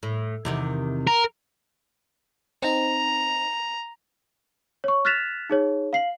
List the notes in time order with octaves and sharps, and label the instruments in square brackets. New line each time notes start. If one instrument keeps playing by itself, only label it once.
[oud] A2
E2 C3 D#3
[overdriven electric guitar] A#4
[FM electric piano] C4 D#4 [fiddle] A#5
[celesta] C#5 C#6
F6 F#6 A6 B6 E7 F7
D#4 G#4 C#5
F5 C7 F#7